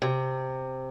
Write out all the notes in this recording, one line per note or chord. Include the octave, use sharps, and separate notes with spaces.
C3